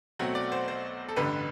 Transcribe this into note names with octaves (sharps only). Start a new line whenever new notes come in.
B1 B2 F#3 A3 C4 F#5
D5
C5
C5
A4
A1 G2 D3 B4